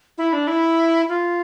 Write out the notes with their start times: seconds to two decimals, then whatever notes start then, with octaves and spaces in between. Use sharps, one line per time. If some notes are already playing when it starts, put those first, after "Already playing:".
0.18 E4
0.33 D4
0.47 E4
1.08 F4